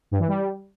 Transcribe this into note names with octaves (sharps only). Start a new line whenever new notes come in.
G2
E3
G3